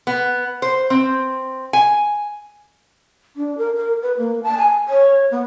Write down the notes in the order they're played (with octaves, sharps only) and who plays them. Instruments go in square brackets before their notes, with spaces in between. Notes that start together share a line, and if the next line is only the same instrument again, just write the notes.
[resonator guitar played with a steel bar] B3
C5
C4
G#5
[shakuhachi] D4
A#4
A#4
B4
A#3
A5
G#5
C#5
B3